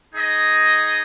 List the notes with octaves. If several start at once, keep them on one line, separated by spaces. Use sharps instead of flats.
D#4 G#4 D#5